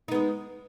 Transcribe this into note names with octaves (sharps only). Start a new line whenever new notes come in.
G#3 B3 D#4